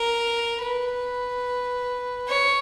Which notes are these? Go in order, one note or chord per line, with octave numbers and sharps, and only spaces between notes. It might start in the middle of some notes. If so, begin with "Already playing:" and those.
Already playing: A#4
B4
C#5